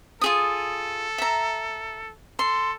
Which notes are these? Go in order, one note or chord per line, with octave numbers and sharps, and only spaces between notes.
F4 G#4 A4 D#6
E5 A#5
A4 C6